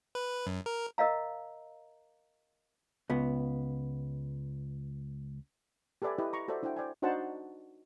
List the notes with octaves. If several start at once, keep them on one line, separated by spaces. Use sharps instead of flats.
B4
F#2
A#4
A#4 D#5 F5 A#5
C#2 B3
G4 A4 B4 D5 E5 G#5
E4 G4 B4 D#5
A#5 C#6
F#4 A4 C5 D5 E5
D4 E4 C5 F#5 G5
C5 D5 G5 G#5
D4 D#4 F#4 C5 F#5 A5